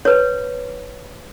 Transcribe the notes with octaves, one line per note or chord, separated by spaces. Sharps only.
B4 C#5